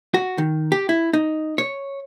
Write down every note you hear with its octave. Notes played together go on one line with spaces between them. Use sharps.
F#4
D#3
G4
E4
D#4
C#5